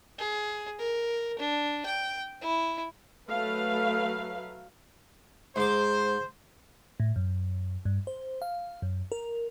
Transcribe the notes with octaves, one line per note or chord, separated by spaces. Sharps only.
G#4
A#4
D4
G5
E4
F#3 A3 B4 F5
G#2 C5 D6
A2
F#2
G2
C5
F5
F#2
A#4